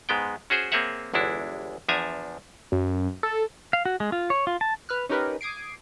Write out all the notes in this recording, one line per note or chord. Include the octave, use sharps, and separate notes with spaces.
G#2 G#3 B3 G5
C#4 F#4 G#4 C5
A#3 C4 G#4 C#5 E5 F#5
G1 E2 G#3 D4 E4
E2 F3 D4 E5 G#5 A#5
F#2
A4
F5
F#4
G#3
F4
C#5
F4
A5
B4 F6 F#6
C#4 D#4 G4 A#4 B4
D6 D#6 G#6 C7 D7